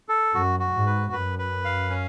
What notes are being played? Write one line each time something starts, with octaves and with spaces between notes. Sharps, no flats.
A4
F#2 F#4
F#4
G#2
B4
F#2 B4
B4
F5
C#4